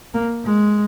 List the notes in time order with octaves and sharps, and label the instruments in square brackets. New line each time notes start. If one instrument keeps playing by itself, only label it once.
[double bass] A#3
G#3